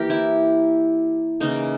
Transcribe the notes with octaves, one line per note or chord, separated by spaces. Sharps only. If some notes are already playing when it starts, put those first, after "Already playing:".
Already playing: E3 A#3 G4 A#4
E4
C#3 E3 A#3 D#4